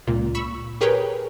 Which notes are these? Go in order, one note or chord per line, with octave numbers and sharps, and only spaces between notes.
C#2 A#2
B5 C#6 E6
G4 G#4 A#4 B4 C#5 G5